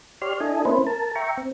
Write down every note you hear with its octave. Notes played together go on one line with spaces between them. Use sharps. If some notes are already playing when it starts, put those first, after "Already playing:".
G4 C#5 D5 C6 F6
D4 E4 A4 D#5 G#5
A#3 C4 C#4 E4 B4 C5
A#4 A5
E5 G5 A#5 C#6
C4